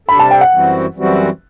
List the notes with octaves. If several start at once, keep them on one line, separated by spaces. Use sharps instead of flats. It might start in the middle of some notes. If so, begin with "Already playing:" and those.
C3 G3 D4 A4 B5
A5
G5
F#5
F#2 E3 G3 C4 F#4
F#2 E3 G3 C4 F#4